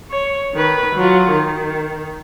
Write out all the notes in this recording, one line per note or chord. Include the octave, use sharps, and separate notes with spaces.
C#5
D#3 B4
F#3 F4
D#3